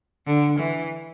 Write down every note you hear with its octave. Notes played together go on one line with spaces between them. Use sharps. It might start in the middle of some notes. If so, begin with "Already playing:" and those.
D3
E3